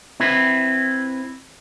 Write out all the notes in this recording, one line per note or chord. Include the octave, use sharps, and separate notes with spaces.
C4 E4 B4